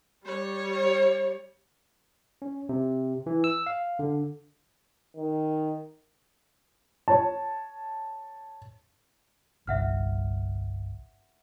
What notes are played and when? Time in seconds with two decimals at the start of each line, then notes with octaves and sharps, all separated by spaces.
0.25 G3 C#5
2.42 C#4
2.69 C3
3.26 E3
3.44 E6
3.66 F5
3.99 D3
5.17 D#3
7.08 C#5 A5
9.67 G1 C2 E5 F#5 F6